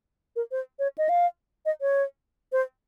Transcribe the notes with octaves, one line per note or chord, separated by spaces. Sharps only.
A#4
C5
C#5
D#5
F5
D#5
C#5
C5